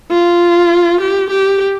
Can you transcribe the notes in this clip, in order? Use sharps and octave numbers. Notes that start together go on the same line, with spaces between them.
F4
G4
G4